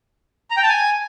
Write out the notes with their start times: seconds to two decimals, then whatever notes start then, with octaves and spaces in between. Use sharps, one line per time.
0.51 A#5
0.57 G5
0.63 A5
0.69 G#5